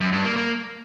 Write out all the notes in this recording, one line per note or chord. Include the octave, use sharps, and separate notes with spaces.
F#2
G2
A#3
A#3